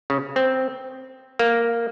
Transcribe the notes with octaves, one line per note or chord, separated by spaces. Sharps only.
C#3
C4
A#3